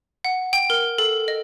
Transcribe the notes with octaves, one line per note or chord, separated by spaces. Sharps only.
F#5
G5
A#4
A4
D#5